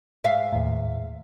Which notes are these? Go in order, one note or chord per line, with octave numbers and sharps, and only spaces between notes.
G#2 E5 F5
D#2 A2